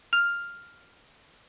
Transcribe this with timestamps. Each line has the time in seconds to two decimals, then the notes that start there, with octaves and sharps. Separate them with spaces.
0.13 F6 F7